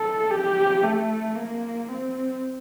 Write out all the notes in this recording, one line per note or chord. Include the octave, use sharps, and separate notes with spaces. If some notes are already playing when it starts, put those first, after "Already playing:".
Already playing: A4
G4
A3
A#3
C4